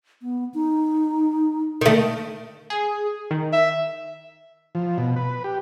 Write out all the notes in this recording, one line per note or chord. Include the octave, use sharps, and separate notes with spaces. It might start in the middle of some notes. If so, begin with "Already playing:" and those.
B3
D#4
D3 D#3 A3
G#4
D#3
E5
F3
B2
B4
G4